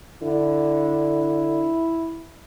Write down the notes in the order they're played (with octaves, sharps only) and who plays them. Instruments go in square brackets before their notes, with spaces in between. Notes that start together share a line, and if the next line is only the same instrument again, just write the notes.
[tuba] D3 [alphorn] E4